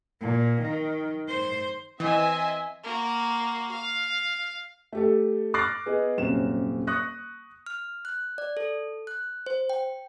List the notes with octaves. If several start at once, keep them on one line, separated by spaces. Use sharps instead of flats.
A#2
D#3
C5
E3 C4 D#5 E5 G#5
A#3 F#4
F5
A3 G4 A4
D6 F6 F#6 A6 A#6 C7
B3 G#4 D#5
D#1 F#2 C3 C#4 E7
C#6 D#6 F#6 A#6
F6
F#6
D5
A4
F#6
C5
G5